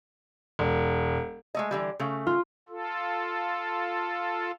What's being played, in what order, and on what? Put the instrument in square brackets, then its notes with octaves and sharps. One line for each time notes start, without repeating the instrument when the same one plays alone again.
[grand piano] E1
[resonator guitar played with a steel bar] G#3 A3 D#5
D3 E3 G3
C#3 A3
[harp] F4
[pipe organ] F4 A4